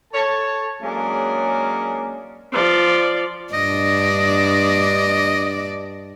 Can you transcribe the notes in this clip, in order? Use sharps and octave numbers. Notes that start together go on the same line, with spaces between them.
A4 C#5 A5
F#3 G#3 A#3 C#4 D4 G#4
F3 D5
G2 D4 D5 D#5